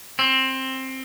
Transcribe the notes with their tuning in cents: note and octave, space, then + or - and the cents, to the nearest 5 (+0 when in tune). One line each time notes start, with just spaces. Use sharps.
C4 +15